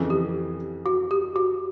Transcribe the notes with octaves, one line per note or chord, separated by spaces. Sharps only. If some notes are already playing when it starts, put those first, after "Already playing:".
Already playing: F2 C#3 E3
G4
F#4
G4
F#4